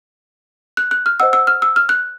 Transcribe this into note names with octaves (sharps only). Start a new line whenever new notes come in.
F#6
F#6
F6
C5 D#5 F#5 E6
E6
F6
E6
F6
F#6